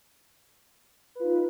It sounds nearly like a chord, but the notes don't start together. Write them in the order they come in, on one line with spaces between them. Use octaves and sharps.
B4 F4 D#4